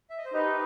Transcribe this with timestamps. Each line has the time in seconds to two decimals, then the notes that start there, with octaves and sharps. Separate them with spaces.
0.10 E5
0.18 D#5
0.25 C5
0.34 D#4 G4 B4